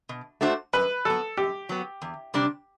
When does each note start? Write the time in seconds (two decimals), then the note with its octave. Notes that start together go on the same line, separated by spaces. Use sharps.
0.09 B2
0.41 A3 D4 F#4 C5
0.73 F#2 B4
1.05 F#3 B3 A4
1.37 F#2 G4
1.69 F#3 B3
2.02 E2
2.34 C3 G3 D4